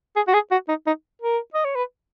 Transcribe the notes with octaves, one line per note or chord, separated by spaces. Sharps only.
G#4
F#4
G#4
F#4
D#4
D#4
A#4
D#5
C#5
B4